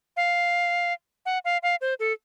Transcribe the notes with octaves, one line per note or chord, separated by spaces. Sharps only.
F5
F#5
F5
F5
C5
A4